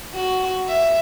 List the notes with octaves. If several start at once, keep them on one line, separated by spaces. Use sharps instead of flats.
F#4
E5